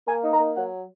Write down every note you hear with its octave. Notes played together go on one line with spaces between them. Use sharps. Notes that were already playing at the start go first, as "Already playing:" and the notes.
A#3 G#5
D#4
A#5
A#3
F#3 F#5